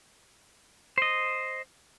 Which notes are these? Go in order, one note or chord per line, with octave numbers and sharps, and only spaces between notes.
C5 D#5